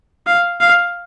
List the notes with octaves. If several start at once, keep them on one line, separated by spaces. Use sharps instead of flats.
F5
F5